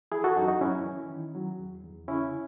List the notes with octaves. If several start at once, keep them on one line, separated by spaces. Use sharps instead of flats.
E3 E4 G#4
F#4 A4
F#2 D#4 F#4
D#4 F#4
F#2 C#4 E4
E3
D#3
F#3
E2
E2
C#3 C#4 E4